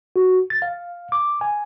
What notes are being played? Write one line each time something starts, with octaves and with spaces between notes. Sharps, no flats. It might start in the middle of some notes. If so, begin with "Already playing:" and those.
F#4
A6
F5
D6
G#5